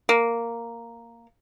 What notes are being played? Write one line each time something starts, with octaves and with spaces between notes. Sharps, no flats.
A#3